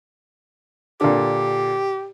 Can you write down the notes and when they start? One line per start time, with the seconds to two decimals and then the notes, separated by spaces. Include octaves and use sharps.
1.01 A#2 D3 G4